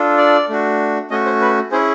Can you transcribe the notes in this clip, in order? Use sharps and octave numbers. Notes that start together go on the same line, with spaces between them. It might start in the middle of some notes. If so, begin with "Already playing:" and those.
Already playing: D4 F4 A4
D5
A3 D4 F#4
A3 C#4 F#4 D#5
C5
B4
C#4 E4 G#4 C5